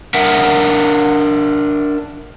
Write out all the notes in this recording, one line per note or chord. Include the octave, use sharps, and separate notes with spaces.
D4 A#4 E5 F#5